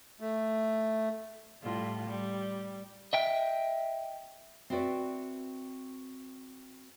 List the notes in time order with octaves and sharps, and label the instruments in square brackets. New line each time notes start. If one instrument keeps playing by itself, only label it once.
[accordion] A3
[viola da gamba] A2 G3 F4
G3
[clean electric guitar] D#5 E5 G5
[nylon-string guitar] C4 E4 F#4 B4 D5